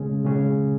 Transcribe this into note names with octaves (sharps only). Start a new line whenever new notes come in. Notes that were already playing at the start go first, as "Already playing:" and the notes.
Already playing: C#3 G#3 C#4 G#4
C#3 G#3 C#4 G#4